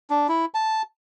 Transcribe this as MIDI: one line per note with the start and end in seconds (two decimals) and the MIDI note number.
0.10 0.27 62
0.28 0.45 64
0.54 0.82 81